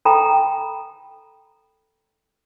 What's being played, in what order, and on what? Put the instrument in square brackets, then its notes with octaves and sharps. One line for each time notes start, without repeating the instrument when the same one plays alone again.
[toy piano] A4 G5 A#5 B5